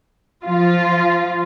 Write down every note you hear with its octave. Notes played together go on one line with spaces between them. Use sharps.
F3 F4